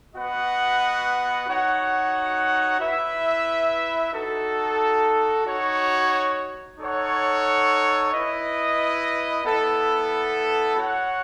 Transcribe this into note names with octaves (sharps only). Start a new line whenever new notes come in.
B3 F#4 B4 D#5 F#5
D#4 F#4 C#5 F#5
E4 B4 E5
D#4 F#4 A4
D#4 F#4 C#5
D#4 A4 C#5 F#5
E4 B4 D#5
B3 E4 A4
F#4 C#5 F#5